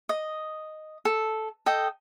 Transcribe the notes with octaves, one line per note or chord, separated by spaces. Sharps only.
D#5
A4
A4 D#5 G5